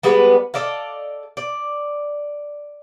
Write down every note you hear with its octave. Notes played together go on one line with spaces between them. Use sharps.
G3 G#3 B3 B4
A4 D5 D#5 F5
D5